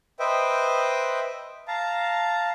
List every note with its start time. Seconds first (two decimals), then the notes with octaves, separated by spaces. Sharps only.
0.20 B4 C5 D#5 E5 G5
1.68 F5 A5 A#5